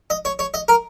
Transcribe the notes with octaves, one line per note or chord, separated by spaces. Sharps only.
D#5
C#5
C#5
D#5
A#4